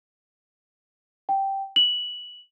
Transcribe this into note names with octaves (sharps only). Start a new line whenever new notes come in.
G5
F#7